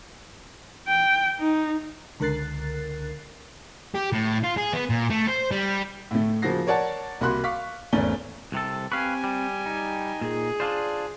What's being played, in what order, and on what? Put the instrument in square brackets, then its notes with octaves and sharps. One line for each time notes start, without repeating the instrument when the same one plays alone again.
[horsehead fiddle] G5
D#4
[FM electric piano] C#2 D3 A#4 F#6 A6 C7
[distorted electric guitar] G4
A2
F4
G#4
B3
A#2
A3
C5
G3
[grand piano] A2 A3
C#3 F3 A#3 F#4 A#6 C7
A#4 C#5 D5 F#5 A5
C2 A#3 F#4 B5 C6 F#6
F5 C#6 D6 B6
G#1 E2 A3 C#4 D5 G7
[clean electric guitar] C2 C3 A4
[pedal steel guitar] C4 C#6 [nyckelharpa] G4 G#5 [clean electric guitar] B4 F5
[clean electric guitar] G3
[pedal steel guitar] D#4
[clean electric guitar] A#2 [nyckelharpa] G#4
[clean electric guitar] D4 F4 C5 [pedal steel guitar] D5